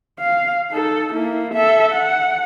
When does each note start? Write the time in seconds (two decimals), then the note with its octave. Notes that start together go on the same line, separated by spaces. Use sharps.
0.20 F5
0.71 D#4 A4
1.14 A#3 E4
1.54 A4 E5
1.93 F#5